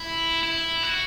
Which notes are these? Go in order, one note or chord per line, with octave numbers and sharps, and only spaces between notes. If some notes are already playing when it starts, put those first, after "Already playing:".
Already playing: E4
E4
F#4